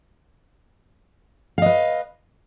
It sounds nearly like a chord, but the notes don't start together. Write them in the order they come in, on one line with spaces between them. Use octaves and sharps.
F5 D#5 B4